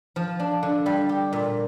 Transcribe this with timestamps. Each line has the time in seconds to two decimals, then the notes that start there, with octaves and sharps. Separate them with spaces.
0.16 F3
0.39 D4
0.63 D3
0.86 G3
1.09 G4
1.33 A#2